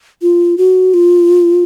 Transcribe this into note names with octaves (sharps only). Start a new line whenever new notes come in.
F4
F#4
F4